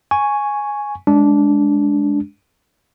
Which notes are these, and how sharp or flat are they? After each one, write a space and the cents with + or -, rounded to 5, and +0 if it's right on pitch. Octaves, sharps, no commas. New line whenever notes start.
G#5 +0 C#6 +0
G#3 +0 D4 -15